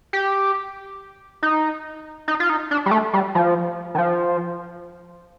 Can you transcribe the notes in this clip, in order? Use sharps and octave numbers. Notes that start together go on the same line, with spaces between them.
G4
D#4
D#4
F4
D#4
D4
G3
A3
G3
F3
D#3
F3